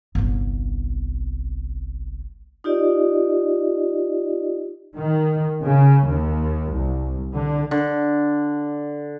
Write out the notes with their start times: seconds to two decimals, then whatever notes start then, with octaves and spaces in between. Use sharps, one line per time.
0.15 G1 C2
2.64 D#4 F4 G4 D5 D#5
4.96 D#3
5.62 C#3
6.06 D#2
6.71 C2
7.33 D3
7.71 D3